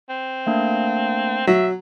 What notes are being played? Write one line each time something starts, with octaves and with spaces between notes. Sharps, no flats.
C4
A3 A#3 D4
F#3 E5